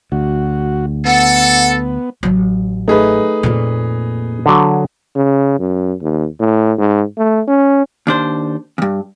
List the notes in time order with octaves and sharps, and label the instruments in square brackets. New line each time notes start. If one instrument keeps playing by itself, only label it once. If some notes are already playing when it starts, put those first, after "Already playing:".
[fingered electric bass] D2 [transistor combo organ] F#4
[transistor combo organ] B3 [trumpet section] A4 [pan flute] F#5
[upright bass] A1 F#3
[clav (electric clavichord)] A3 [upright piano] D#4 G#4 B4
[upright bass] F2 A#2
[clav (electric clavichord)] D3 F#3
[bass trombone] C#3
F#2
D#2
A2
G#2
A3
C#4
[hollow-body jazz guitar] D#2 D4 C5
E2 G2